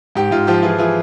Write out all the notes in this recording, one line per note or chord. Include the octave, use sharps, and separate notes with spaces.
G#2 G4
G#2 F4
F3 G4
E3 F4 G#4
E3 F4 G#4